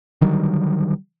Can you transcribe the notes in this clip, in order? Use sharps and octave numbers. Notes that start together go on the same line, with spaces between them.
D3 D#3 F#3 G3